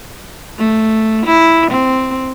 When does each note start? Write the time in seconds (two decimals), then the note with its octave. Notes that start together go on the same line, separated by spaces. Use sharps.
0.58 A3
1.26 E4
1.71 C4